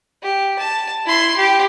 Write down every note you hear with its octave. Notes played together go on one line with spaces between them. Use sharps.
G4
A5
E4 C6
G4